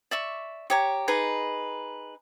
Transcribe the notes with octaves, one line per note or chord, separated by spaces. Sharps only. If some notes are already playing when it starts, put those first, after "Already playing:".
D5 E5 C#6
G4 C#5 A#5
D#4 G#4 B4 A#5